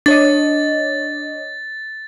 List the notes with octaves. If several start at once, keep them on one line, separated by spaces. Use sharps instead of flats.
D4 C#5 D#5 A6